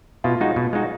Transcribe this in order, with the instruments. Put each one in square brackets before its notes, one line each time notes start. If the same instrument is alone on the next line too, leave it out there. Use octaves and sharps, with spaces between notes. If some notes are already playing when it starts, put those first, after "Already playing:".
[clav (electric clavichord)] B2 [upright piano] F4
[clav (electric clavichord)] G#3 D#4 F#4
B2
G#3 D#4 F#4